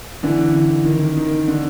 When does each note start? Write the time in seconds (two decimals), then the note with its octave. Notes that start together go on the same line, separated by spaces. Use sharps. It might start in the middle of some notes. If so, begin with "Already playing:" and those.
0.23 D3 E3
0.55 D3
0.85 D#3
1.17 D#3
1.48 D3